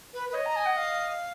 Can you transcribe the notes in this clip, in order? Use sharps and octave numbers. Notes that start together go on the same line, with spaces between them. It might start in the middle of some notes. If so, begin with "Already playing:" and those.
B4
B4
C#5 D#5
A#5
G#5
F#5
F5